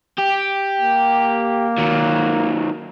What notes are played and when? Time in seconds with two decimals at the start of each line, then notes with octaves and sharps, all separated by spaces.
0.18 G4
0.80 A#3
1.79 D#3 F#3